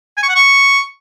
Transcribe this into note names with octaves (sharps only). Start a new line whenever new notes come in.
G#5
C#6
F#5
C#6